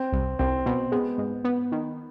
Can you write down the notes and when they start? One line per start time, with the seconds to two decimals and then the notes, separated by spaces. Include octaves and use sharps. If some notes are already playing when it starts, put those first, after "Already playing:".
Already playing: C4
0.12 C2
0.39 C2 C4
0.66 B2
0.92 G#3 B3
1.18 G#2
1.44 B3
1.72 D#3